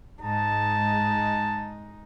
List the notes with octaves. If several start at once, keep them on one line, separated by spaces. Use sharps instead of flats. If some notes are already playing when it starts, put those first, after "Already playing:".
G#2 G#3 D#4 A5